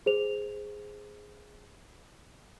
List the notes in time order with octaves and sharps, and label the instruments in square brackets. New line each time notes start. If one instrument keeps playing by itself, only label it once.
[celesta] G#4 C5 F7